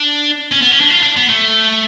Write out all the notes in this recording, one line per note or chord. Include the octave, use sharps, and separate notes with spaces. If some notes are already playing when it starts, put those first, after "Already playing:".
Already playing: D4
C#4
B3
C#4
D4
F4
D4
B3
A3